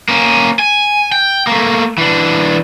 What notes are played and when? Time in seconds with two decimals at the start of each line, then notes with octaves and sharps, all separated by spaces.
0.09 A#3 C#4
0.59 G#5
1.12 G5
1.47 A3 A#3
1.98 E3 D4